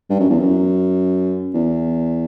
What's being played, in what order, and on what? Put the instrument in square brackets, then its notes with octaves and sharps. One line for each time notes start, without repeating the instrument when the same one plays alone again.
[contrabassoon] G2
F#2
E2
F#2
E2